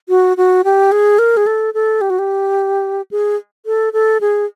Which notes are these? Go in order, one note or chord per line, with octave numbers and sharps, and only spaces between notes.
F#4
F#4
G4
G#4
A#4
G#4
A4
A4
G4
F#4
G4
G#4
A4
A4
G#4